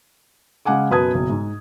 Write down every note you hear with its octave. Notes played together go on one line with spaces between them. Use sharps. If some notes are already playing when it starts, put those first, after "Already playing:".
C#3 G#3 F5 F#5 G#5 D6
F#2 B2 B4 A5 D#6 G#6
F#1 B2
G#2